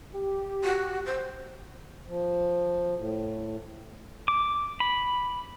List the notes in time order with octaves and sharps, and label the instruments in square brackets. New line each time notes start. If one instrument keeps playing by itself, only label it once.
[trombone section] G4
[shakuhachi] F#4
C5
[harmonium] F3
A2
[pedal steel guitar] D6
B5